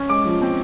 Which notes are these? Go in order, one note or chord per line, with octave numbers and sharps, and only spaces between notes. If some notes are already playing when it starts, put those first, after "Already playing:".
Already playing: C#4
G#3 D6
F3
C4